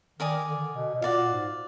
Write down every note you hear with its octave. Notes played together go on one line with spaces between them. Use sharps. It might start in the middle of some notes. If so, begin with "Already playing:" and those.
D#3 A#4 D5 G#5 D#6
D3
B2
B2
A#2 F#4 D5 F5
G#2